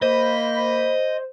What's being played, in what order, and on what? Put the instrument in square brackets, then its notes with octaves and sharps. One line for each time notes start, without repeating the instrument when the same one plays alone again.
[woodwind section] A#3 B5 [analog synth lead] C5 [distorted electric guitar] D#5